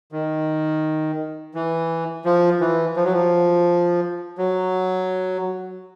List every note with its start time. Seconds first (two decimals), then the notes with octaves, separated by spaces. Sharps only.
0.12 D#3
1.54 E3
2.25 F3
2.60 E3
2.96 F3
3.05 F#3
3.12 F3
4.38 F#3